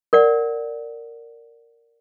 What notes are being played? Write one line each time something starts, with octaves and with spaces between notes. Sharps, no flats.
A#4 D5 F#5